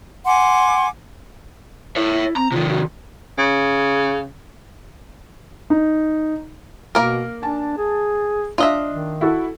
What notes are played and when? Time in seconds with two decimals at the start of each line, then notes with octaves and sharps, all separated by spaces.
0.25 F#5 G#5 C6 D6
1.96 E4 C#5 E5
2.36 C4 A#5
2.52 C3 D#3 F4
2.69 F#4
3.38 C#3
5.70 D#4
6.95 B2 A#3 A#4
7.42 D4 G#5 A5
7.78 G#4
8.58 D4 F4 D#5 E5
8.91 D#3
9.21 E4 F#4 A4